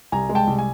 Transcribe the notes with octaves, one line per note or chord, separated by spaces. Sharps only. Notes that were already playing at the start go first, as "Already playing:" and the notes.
C2 G#5 A#5
G#3
G5 A5
C2
G#5